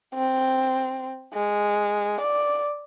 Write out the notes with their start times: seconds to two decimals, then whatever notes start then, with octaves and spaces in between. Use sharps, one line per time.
0.15 C4
1.34 G#3
2.21 D5